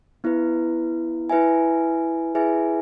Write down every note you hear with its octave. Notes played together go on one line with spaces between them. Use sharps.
B3 E4 B4
E4 B4 E5 G#5
E4 G#4 B4 E5 G#5